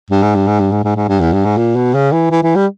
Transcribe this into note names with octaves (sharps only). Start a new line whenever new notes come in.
G2
G#2
G2
G#2
G2
G#2
G#2
G#2
G2
E2
G2
G#2
A#2
B2
C#3
E3
E3
E3
G3